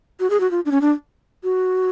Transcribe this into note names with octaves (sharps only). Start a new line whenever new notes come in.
F#4
G#4
F#4
F4
D4
C#4
D4
F#4